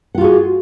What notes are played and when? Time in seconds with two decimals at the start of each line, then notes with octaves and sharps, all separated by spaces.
0.15 F#5
0.18 F4
0.21 F#4
0.24 G#4